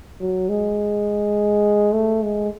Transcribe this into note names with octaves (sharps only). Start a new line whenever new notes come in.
F#3
G#3
A3
G#3